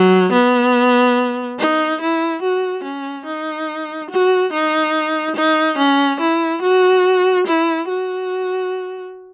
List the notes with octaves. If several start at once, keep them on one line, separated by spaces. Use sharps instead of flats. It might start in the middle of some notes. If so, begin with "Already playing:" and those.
Already playing: F#3
B3
D#4
E4
F#4
C#4
D#4
F#4
D#4
D#4
C#4
E4
F#4
E4
F#4